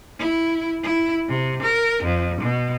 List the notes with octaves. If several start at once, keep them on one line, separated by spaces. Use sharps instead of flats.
E4
E4
C3
A#4
F2
B2